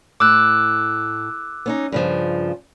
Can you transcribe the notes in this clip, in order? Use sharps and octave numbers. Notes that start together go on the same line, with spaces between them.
A2 D6 E6 F#6
B3 C#4 D#4
G2 C#3 F3